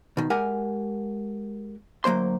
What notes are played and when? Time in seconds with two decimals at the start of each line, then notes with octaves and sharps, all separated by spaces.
0.17 B2 D#3
0.30 G#3 G4 A#4 F#5 G#5
2.04 D2 F#3 A#3 C5 C6